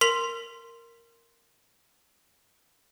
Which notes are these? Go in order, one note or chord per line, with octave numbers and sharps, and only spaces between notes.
A#4 C6 B6 F7